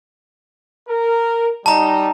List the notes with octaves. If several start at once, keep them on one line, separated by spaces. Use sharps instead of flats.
A#4
G3 D#4 A5 A#5